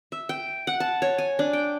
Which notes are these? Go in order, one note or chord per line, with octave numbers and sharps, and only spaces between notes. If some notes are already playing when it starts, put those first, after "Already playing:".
E5
G5
F#5
A5
C#5
G#5
D4
G5